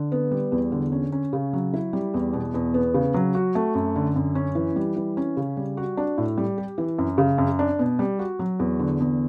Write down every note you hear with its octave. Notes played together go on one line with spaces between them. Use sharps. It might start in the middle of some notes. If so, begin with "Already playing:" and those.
Already playing: D3
B3
G3
E2
D3
C#4
C#4
C#3
F#3
E4
G3
E2
B2
E2
B3
C#3
F#3
F#4
A3
F#2
D3
F#2
C#4
E3
G3
E3
C#4
C#3
G3
F#4
D4
A2
G3
G4
E3
F#2
C#3
F#2
D4
B2
G3
F#4
F#3
E2
D3
E2